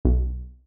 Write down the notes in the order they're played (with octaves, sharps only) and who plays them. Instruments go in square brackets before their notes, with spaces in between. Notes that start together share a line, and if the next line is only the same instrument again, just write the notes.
[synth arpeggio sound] B1